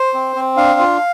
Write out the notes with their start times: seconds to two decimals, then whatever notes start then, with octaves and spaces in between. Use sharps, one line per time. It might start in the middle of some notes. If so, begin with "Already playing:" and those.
Already playing: C5
0.14 C4
0.36 C4
0.57 D4 F5
0.80 F4